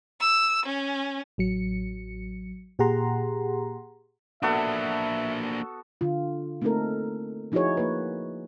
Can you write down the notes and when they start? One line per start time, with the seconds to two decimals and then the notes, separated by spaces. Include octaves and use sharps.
0.20 E6
0.66 C#4
1.38 A1 F#3 C#7
2.79 A#2 G4 G#4 F#5 A#5 C6
4.42 A#3 B3 D4 F#4 A4 E5
6.01 D3 F4
6.62 A3 A#3 C4 D#4 A4 A#4
7.52 F3 D#4 E4 F#4 G#4 C#5
7.77 A#3 B4